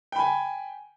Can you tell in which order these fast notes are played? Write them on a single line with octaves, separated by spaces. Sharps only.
G5 B5 G#5